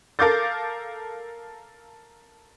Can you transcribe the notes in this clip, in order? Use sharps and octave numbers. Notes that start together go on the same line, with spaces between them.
A4 A#4 F5 D6 G6 A6